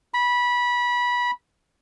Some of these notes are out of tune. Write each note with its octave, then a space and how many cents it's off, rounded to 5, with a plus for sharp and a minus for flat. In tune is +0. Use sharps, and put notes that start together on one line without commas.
B5 -20